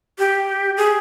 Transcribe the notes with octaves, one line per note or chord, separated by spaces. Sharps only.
G4
G#4